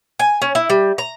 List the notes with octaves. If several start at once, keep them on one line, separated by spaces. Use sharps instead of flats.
G#5
C#4
E4
G3
A#5